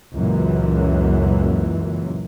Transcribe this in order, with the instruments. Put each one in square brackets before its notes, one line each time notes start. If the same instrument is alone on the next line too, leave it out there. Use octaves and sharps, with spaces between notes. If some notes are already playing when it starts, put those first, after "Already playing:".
[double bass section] C#2 F#2 A#2 E3